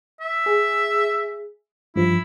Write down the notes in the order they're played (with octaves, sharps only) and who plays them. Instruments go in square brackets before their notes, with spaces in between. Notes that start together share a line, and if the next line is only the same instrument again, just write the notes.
[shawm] E5
[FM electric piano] G#4
[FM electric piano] G2 F3 [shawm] E4